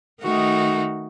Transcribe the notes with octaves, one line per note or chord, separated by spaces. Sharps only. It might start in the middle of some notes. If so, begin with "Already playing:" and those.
D#3 A3 D#4 F#4